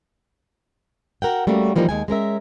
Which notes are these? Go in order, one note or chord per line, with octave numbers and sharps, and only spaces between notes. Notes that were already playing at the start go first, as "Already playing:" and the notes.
F#4 A#4 F#5 G5
G3 A3 A#3 C#4 F#4
E3 F3 G3 A#3 D#4
D#2 G#3 G#5
G#3 C#4 A#4 E5